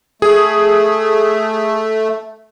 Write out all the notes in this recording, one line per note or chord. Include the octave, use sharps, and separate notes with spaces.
A3 G#4